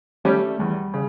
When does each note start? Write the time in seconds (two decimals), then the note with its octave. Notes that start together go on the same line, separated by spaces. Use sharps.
0.25 G3 A3 C#4 G4
0.59 E2 G3
0.94 C#3